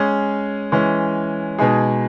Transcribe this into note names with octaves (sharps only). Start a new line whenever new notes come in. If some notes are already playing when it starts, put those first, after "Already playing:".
Already playing: G#3 C#4 G#4
E3 G#3 C#4
B2 G#3 D#4 G#4